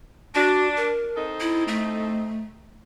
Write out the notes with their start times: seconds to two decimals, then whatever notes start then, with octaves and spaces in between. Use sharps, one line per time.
0.35 D4 F#4
0.77 A#4
1.16 C4 D#4 A4
1.40 E4
1.68 A3